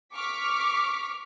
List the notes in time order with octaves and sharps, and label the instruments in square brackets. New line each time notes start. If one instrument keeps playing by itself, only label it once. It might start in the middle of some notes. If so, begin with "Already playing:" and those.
[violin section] C#6 D6 F6 B6